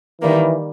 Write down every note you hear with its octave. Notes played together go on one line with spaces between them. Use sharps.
D#3 E3 G3 A#3